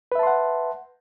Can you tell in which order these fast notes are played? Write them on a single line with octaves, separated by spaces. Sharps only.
B4 E5 A5 C6 F#5